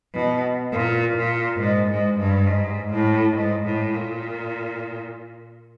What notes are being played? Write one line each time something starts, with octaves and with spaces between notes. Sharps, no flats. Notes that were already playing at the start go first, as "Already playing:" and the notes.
B2
A#2
A#2
G#2
G#2
G2
G#2
A2
G#2
A2
A#2